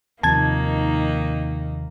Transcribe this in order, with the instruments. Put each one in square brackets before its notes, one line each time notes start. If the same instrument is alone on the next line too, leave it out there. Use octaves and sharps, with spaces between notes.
[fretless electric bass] D#2 C3 F3 [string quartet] D#3 A#3 D#4 [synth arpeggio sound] A5 G#6